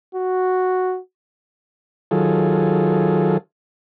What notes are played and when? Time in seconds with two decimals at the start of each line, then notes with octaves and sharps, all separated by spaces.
0.15 F#4
2.11 D#3 F#3 F4 G#4 A4